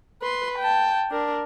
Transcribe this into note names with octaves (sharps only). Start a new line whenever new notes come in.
B4 C6
G5 A5
D4 A#4